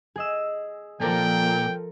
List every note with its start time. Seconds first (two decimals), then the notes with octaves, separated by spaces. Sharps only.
0.16 G#4 D#5 E6
1.01 A#2 F3 A4 A#4 G5